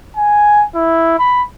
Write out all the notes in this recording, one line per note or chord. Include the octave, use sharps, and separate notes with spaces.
G#5
E4
B5